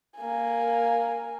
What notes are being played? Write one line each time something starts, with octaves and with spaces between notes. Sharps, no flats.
A#3 G#5